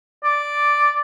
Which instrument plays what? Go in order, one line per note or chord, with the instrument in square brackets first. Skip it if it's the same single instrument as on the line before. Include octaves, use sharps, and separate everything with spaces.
[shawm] D5